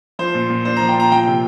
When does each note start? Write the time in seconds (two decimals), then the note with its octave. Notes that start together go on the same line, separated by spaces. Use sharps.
0.19 F3 C5
0.34 A#2
0.50 A#2
0.65 D4 C5
0.76 A#5
0.81 F3
0.89 G5
0.96 A#2 A#5
1.12 F3 G5
1.27 C3